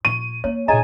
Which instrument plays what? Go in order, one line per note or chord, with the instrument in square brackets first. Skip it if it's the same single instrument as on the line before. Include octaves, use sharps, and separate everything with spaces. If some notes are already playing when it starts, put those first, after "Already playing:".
[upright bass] A#2 [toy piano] C#6 [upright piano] D#7
[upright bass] A#3 [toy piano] C#5
[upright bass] A#2 D#4 [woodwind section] G#4 C#5 G#5 [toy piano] D#5 A#5